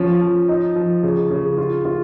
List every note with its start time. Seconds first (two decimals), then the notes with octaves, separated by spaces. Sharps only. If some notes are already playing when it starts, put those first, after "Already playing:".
Already playing: F3 C#4
0.22 F3
0.48 D#4
0.76 F3
1.03 C#3
1.31 C#3
1.58 F4
1.85 F4